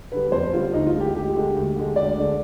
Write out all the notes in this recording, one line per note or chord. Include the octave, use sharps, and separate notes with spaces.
D3 G3 B4
F2 C5
D3 G3 F4
D2 D#4
F4
D3 G#3
G4
D2 G4
D3 G#3
D2
D3 G#3
D2 D5
D3 G#3